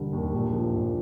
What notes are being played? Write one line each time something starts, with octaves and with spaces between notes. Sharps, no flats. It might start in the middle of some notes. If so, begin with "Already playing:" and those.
Already playing: E1 D3 G3
D#2
A#1
F3
A#1